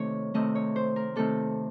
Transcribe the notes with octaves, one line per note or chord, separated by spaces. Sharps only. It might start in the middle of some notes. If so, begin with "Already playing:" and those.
Already playing: C3 D#3 A3 C4 C#5
C3 D#3 A3 C4 D#5
C#5
C5
A#4
C3 D#3 A3 C4 A4